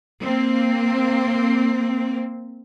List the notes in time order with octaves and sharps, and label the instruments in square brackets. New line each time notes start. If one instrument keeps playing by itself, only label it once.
[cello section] A#3 C4